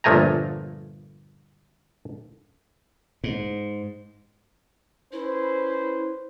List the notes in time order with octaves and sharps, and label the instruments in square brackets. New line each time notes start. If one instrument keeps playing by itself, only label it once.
[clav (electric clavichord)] G1 A#2 F3 A3 G#5 A#5
[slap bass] G#2
[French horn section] C#4 B4 C5 [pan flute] E4